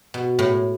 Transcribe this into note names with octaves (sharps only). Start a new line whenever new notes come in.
B2
A2